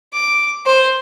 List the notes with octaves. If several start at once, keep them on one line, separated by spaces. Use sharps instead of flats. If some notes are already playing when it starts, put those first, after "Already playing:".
D6
C5